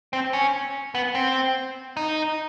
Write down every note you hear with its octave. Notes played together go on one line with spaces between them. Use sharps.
C4
C#4
B3
C4
D#4